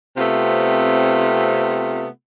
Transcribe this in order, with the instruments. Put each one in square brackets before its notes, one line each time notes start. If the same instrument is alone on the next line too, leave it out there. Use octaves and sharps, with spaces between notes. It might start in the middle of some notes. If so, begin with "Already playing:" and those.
[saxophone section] C3 A3 B3 C4 F4